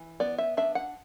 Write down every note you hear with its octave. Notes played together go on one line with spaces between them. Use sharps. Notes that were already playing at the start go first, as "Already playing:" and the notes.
Already playing: E3
B3 D5
E5
D4 E5
F#5